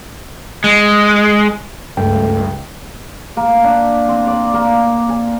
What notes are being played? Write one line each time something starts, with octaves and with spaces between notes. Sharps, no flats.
G#3
C#2 G2 A3 G5
A#3
D4
C4
D5
A#3
G#5